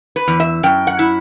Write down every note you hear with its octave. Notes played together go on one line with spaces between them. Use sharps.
B4
E2
E5
F#2 G5
F#5
E4